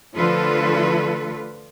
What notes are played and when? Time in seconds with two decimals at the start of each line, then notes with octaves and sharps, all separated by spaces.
0.15 D3 F3 A3 F4 A4 B4